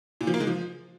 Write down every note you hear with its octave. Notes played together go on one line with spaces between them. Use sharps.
A#2
F3
A#3
G#3
F3